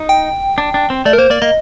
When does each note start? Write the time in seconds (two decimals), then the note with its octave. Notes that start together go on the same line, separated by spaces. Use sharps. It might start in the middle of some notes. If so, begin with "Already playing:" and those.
Already playing: D#4
0.09 G5
0.58 D4
0.74 D4
0.90 C4
1.05 A3 D5
1.13 A#4
1.18 A#3 C5
1.30 A#3 D5
1.42 A#3 D#5